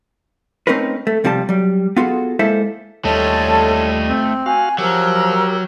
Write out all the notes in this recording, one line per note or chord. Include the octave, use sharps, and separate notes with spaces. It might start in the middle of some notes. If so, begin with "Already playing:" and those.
A3 C4 C#4 D#4 A#4 B4
A3
B1 C3 F3 G3 G#4 A5
F#3 G3
B3 F4 F#4 G#4 A4
G#3 A#3 E4 A4 C5 E5
D#2 G3 A3 F4 A4 C#5 D#5 A5
C4
F#4 F5 G#5
F3 F#3 G4 A#4 E6